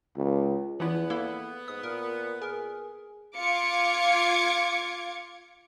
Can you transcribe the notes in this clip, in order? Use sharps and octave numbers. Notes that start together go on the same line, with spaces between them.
C#2
E2 E3 F3 B3 E4
A#3 E4 A4
G#2 D#6
A#2 A#4
G#4 A#4
F4 D6 G#6 C#7